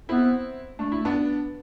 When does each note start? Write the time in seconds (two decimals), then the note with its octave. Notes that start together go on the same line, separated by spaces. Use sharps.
0.09 B3 C4 E4
0.79 A3 D4
0.92 E4
1.05 B3 D4